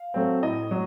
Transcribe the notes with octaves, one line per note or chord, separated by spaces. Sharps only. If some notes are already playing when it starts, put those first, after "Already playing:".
Already playing: F5
F#3 A3 C4
A2 D#5
F#3